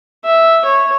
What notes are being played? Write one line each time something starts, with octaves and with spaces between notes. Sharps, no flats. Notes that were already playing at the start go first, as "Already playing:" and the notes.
E5
C#5